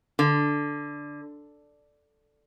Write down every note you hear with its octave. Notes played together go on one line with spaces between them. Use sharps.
D3